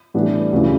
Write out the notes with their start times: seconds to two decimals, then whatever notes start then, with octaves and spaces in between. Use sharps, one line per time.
0.14 A2 E3 G3 B3 D4
0.52 D2 C#3 E3